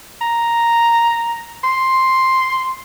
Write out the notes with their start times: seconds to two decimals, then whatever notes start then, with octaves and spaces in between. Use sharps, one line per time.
0.21 A#5
1.64 C6